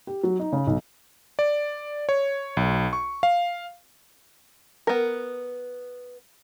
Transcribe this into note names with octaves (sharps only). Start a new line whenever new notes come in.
G4
F#3
D#4
C#3
B1
D5
C#5
B1
C#6
F5
B3 A#4